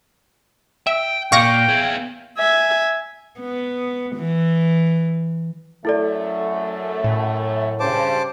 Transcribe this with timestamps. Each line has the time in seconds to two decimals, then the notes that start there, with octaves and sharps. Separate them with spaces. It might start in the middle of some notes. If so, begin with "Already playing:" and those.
0.87 E5 G5
1.32 A#2 F5 G5 C#6 D6 A#6
1.69 B3 G#4
2.38 E5 G#5
3.40 B3
4.17 E3
5.85 F#2 A3 E4 A4 D5
7.04 A2
7.80 G2 C#3 C5 A5 D6